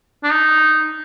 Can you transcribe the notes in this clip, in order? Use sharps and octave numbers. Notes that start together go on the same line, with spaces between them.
D4
D#4